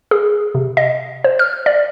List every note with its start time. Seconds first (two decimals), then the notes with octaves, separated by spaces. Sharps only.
0.11 G#4
0.55 C3
0.77 D#5
1.24 C5
1.39 F6
1.66 D5